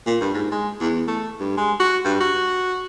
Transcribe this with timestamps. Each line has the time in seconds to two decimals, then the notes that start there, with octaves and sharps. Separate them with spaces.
0.06 A#2
0.21 G2
0.34 G#2
0.52 G#3
0.80 E2
1.08 A3
1.40 G2
1.57 G#3
1.80 F#4
2.05 G2
2.20 F#4